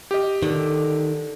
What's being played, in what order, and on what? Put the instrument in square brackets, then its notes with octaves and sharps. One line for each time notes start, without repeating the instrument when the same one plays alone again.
[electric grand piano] G4 D#5
[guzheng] D3 [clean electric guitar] D#3